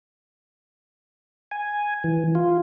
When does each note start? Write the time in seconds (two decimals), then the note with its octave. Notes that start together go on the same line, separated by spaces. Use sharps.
1.51 G#5
2.04 E3
2.35 F4